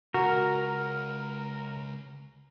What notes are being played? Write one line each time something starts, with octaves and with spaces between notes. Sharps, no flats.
C#2 F#4 A#4